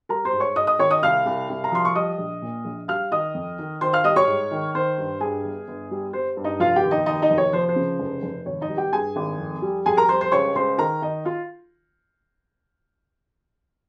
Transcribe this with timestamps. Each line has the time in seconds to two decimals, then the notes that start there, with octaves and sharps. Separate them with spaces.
0.09 G3 A#4 A#5
0.25 C5 C6
0.33 G#2
0.40 C#5 C#6
0.55 G#2 D#5 D#6
0.67 D#5 D#6
0.79 D#3 C#5 C#6
0.91 D#5 D#6
1.02 C2 F5 F6
1.26 C2
1.50 C2
1.64 A#5
1.72 F3 C6
1.85 C#6
1.95 G3 D#5 D#6
2.18 A#1
2.42 A#2
2.65 A#1
2.88 G3 F5 F6
3.12 D#3 D#5 D#6
3.35 F2
3.59 D#3
3.81 D#3 C5 C6
3.93 F5 F6
4.04 G3 D#5 D#6
4.16 C#5 C#6
4.27 G#2
4.51 D#3
4.75 D#3 C5 C6
4.98 G2
5.20 G2 G#4 G#5
5.45 G1
5.68 G1
5.91 G3
6.13 G3 C5
6.37 G2
6.44 D#4 D#5
6.60 F1 F4 F5
6.76 G4 G5
6.83 D#2
6.91 D#4 D#5
7.06 D#2 D#4 D#5
7.22 D#4 D#5
7.30 F1
7.38 C#5
7.53 F3 C5
7.69 C5
7.76 C#3
8.00 F1
8.23 F1
8.46 G#1 C#5
8.61 D#4 D#5
8.69 G3
8.77 G4 G5
8.93 G2 G#4 G#5
9.16 G#1
9.39 F2
9.62 G3
9.86 F2 G#4 G#5
9.97 A#4 A#5
10.09 G3 C5 C6
10.21 C5 C6
10.32 C#2 C#5 C#6
10.55 C#2 C5 C6
10.78 D#3 A#4 A#5
11.02 D#3 D#4 D#5
11.25 F4 F5